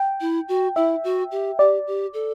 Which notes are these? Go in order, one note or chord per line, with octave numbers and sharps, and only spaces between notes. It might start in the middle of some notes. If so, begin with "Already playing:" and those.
Already playing: G5
E4
F#4
E4 E5
F#4
G4
G4 D5
G4
A4